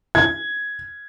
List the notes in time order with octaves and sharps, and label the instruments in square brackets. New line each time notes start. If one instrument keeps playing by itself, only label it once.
[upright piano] G#6